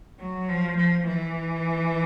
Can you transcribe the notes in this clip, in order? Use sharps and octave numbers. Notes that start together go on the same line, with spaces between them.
F#3
F3
F3
E3